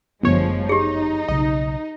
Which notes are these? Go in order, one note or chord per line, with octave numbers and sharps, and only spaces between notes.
G1 F#2 F3 G#3 A3 B3 C#5
D#4 G4 G#4
B1 C#3 D#5